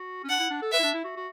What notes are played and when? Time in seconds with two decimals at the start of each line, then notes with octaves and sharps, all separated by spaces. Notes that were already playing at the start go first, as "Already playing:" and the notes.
Already playing: F#4
0.24 C#4
0.29 D4 F#5
0.39 E4
0.50 D4
0.62 A4
0.72 B4 E5
0.79 E4
0.83 D4
0.94 E4
1.04 F#4
1.16 F#4